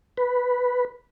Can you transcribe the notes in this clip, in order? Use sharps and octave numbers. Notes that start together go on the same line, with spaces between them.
B4